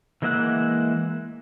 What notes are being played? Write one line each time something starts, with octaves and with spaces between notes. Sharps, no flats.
E3 G#3 A#3 E5 F#5